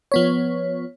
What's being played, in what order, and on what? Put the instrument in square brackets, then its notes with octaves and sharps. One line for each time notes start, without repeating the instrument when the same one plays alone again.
[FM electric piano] F3 B3 C#5